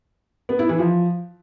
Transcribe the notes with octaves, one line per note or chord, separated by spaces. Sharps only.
B3
E4
E3
F3